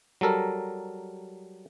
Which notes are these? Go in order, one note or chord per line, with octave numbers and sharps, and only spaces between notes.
F#3 G3 A4 A#4